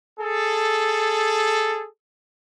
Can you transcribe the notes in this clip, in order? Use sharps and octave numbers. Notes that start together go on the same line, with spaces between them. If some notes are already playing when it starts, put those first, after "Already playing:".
G#4 A4